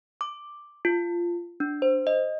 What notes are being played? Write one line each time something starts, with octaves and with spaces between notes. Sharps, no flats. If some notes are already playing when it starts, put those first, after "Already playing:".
D6
F4
D4
C5
D#5